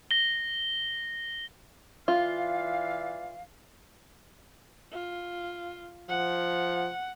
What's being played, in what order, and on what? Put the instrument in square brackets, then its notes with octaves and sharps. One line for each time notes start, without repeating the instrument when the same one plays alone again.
[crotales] A#6 G7
[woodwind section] E3 D5 F5 [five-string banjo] F4
[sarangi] F4
[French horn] F3 [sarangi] F#5